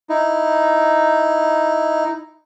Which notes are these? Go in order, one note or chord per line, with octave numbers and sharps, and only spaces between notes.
D#4 E4